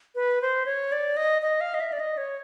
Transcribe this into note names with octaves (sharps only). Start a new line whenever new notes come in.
B4
C5
C#5
D5
D#5
D#5
F5
D#5
E5
D5
D#5
C#5